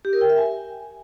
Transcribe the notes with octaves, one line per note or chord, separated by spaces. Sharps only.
G4
A#4
G5
E5
G#5